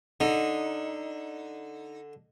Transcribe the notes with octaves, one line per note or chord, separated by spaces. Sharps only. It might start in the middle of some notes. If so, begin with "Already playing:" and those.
D3 D#4